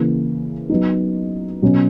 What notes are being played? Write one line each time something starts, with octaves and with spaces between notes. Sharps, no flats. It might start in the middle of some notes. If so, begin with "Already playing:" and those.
Already playing: C#3 E3 A#3
F#3 B3 D#4
B2 F#3 C#4